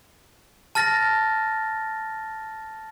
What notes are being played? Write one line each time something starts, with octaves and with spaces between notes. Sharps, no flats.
A5 F6 A6 A#6